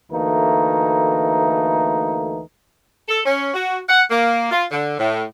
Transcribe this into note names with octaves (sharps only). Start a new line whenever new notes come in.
D2 E3 A3 A#3 D#4
A4
C#4
F#4
F#5
A#3
F4
D3
A2